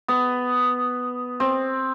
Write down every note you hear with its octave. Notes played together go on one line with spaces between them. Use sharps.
B3
C4